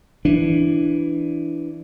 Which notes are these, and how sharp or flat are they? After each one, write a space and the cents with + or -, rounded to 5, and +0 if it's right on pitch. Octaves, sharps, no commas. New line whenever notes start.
E3 +5 D4 +0